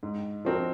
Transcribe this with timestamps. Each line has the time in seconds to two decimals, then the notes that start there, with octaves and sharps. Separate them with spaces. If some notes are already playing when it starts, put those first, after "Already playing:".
0.03 G#2
0.45 F3 C4 F#4 A#4